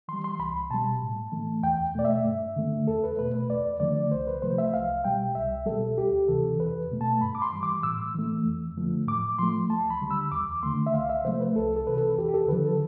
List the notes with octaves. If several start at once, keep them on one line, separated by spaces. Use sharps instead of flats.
E3 G3 C6
C6
C2 B5
B2 G3 A5
A2
E3 A3
E2 G5
B2 A3 D5
E5
G2
D3 A3
E2 A4
B4
B2 A3 B4
B4
E2 D5
D3 F3 A3 D5
C2 C5
B4
C3 F3 A3 C5
E5
C2 F5
B2 G3 G5
C2 E5
B2 G3 A4
D2 G4
C3 E3 A4
E2 B4
B2 A3
A5
G2 B5
D6
C6
E3 G3
D6
A2 E6
E3 A3
F2
D3 F3 A3
A2 D6
F3 A3 C6
D2 A5
B5
D3 G3
E6
E2 D6
D3 A3 C6
E5
C2 F5
E5
C3 F3 A3 C5
B4
C2 A4
A4
C3 E3 B4
A4
E2 G4
G4
A4
D3 F3 B4
A4